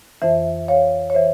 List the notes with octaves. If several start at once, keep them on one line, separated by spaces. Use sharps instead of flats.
F2 E3 C5 E5
C#5 F5
C#5
E3 C5 E5